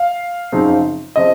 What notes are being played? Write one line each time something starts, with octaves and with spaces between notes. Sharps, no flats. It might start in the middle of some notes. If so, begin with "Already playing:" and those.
Already playing: F5
F#2 C#3 F3 C4 D#4
C#3 F3 C4 D#5